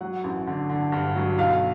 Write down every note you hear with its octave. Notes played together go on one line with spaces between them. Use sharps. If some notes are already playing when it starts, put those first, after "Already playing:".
F#3 F#5
A1
D3
D3
G2
F#3
B1 F5